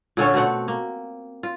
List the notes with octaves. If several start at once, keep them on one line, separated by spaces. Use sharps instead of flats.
A#2 D3 C#4 C#5
B2 A3 C4 F#5
A#3
F4